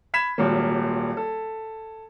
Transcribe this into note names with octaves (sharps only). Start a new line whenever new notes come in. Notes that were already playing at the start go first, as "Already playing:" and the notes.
B5 G#6 B6 E7
D#1 G#1 F#3 A#3
A4